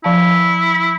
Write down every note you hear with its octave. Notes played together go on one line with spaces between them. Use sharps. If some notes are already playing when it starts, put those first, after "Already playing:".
F3 E4 F5 A5